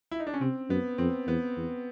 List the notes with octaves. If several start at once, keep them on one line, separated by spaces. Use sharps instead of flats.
E4
D#4
D4
C#4
C3 C4
F#2 B3
F2 C4
E2 B3
E2